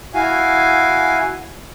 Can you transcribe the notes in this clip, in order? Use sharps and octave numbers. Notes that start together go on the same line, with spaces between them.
E4 F#4 F5 G#5